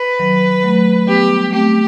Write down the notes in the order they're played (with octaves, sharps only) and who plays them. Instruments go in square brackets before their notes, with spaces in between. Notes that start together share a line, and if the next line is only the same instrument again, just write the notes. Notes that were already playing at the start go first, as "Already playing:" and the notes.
Already playing: [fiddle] B4
[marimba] D#3 F#3
F#3 A3
[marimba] G3 B3 [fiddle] G4
[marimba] A3 C4 [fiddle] G4